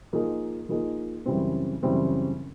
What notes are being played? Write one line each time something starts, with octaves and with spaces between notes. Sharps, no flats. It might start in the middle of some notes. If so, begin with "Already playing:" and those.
F3 A#3 D#4 G#4
F3 A#3 D#4 G#4
F#2 C#3 E3 G3 C4
F#2 C#3 E3 G3 C4